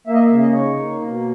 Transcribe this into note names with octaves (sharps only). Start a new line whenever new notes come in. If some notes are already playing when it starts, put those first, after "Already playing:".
A#3 E5
D#5
E5
C#3 E5
D#5
D#4 C#5
A#3
B2